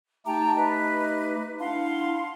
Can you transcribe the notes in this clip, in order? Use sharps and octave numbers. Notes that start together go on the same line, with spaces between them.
A3 D#4 G4 G5 A5 A#5
B4 D#5
D4 E4 F5 F#5 C6